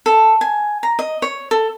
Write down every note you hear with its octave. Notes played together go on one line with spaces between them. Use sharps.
A4
G#5
A#5
D#5
C#5
A4